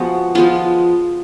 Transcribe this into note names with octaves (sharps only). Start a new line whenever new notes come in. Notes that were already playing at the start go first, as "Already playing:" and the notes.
Already playing: F3 G#3 B3 F#4
F3 G#3 B3 F4